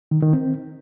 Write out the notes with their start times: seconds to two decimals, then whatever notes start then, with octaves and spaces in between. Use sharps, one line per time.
0.11 D#3
0.22 D#3
0.33 C4